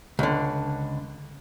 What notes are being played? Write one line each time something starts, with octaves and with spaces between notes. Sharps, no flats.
C#2 D3